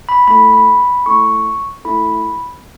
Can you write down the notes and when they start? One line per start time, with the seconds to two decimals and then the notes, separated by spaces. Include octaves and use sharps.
0.09 B5
0.27 A3 E4 A4 B5
0.54 B5
0.81 B5
1.06 A3 E4 A4 C#6
1.85 A3 E4 A4 B5